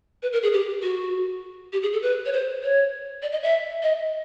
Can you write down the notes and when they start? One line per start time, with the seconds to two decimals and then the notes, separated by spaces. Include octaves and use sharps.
0.23 B4
0.33 A#4
0.43 G#4
0.53 G4
0.83 F#4
1.73 G4
1.82 G#4
1.93 A4
2.02 B4
2.26 C#5
2.33 C5
2.63 C#5
3.22 D5
3.32 D#5
3.43 E5
3.83 D#5